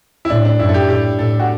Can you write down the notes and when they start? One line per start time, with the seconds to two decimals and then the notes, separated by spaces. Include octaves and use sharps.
0.25 E4
0.30 A2 D4
0.45 D4
0.59 F#2 E4
0.69 A4
0.74 G4
0.89 A2 G4
1.19 A2 A4
1.39 F#4